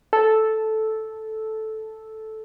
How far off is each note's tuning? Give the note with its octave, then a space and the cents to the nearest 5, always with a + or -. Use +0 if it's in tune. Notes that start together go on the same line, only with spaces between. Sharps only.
A4 -5